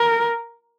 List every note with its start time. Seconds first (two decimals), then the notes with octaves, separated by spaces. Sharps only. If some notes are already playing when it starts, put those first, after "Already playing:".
Already playing: A#4